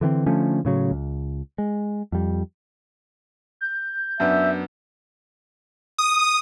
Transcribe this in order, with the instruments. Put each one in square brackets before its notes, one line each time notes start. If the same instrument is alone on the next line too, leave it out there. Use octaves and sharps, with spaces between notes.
[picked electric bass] D3 E3 G3 C4
D3 F3 A3 C#4
A2 C#3 F#3
C#2
G#3
F2 G3
[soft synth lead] G6
[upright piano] F#2 B3 D4 [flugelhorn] E5
[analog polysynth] D#6